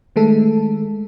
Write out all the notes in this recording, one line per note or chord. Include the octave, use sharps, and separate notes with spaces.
D#3 G#3 A3 A4